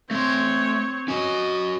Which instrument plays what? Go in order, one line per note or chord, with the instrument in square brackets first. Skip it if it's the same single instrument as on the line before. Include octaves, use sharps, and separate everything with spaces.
[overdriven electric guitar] A3 C6 [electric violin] C4 C#5
[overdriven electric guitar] C#4 F#4 [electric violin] D#5